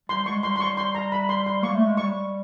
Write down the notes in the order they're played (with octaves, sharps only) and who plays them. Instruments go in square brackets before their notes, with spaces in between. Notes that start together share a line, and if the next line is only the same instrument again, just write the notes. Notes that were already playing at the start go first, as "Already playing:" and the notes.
[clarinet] G3 [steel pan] C6
[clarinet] G#3 [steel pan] C#6
[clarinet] G3 [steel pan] C6
[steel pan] C6
C#6
C6
A#5
B5
C6
C6
[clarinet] A#3 [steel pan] C#6
[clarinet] A3
G#3
[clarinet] G3 [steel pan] C#6